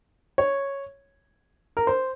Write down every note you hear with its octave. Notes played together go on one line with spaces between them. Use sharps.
C#5
A#4
C5